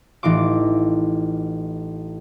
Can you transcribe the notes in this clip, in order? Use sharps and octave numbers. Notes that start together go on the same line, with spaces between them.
A1 E3 D#4 F4 D6